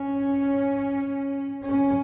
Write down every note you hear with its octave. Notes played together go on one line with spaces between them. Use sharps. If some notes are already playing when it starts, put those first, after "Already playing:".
Already playing: C#4
C#4